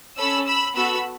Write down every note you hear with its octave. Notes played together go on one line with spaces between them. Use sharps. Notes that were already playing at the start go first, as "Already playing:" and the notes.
C#4 A4 B5 E6
B5 E6
B3 F#4 A4 B5 E6